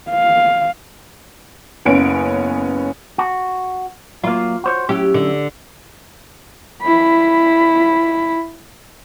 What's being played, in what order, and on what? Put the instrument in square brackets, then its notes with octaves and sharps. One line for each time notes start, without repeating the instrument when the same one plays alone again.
[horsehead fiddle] F5
[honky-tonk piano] F#1 B3 C#4 D7
[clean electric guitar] F#4
[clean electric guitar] F#3 A#3 [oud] F4
[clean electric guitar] F#4 C5 C#5
[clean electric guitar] F#3 C#4 E4 [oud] G4
[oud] D3
[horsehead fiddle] E4 B5